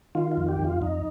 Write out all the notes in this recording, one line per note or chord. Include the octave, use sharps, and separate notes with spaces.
D#3 F4
F4
F2
G4
F2
F4
F2 D#4